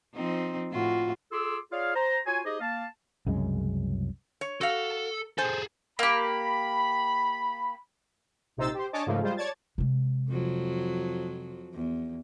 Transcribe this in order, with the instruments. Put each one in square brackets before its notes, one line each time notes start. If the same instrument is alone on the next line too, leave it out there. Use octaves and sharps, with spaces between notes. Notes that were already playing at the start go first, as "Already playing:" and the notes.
[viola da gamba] F3 C4 D#4
A2 F4 F#4
[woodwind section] F4 G#4 A4 C6 D6 E6
F4 G#4 C#5 D5 F5
C5 A#5
F4 F#4 C#5 G#5
D#4 G4 G#4 C5 D#5
A#3 F5 A5
[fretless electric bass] C2 F#2 C#3 G#3
[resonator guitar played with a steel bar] C#5
[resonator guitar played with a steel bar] F#4 F5 [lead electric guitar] A4
[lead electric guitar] G#4 A4 [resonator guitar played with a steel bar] C5 G#5
[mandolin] A#3 G4 [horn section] B5
[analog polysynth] A#1 C3 D#4 C5 E6 A6
G4 C5
D4 C#5 D#5 G#5 A5 D6
G#2 C#3 F3 A3 A#3
G3 G#3 F4 C5
C#5 D5 A5 G#6 A6
[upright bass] C3 G#3
[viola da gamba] F2 F3 F#3
E2